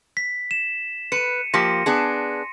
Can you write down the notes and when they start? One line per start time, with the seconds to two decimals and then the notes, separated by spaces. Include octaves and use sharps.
0.17 B6
0.51 E7
1.12 B4 C#7 D#7
1.54 F3 A#3 G4 C6 A#6 C#7
1.86 B3 D4 G#4